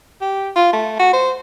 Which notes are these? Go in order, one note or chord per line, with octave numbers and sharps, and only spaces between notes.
G4
F4
A3
F#4
C5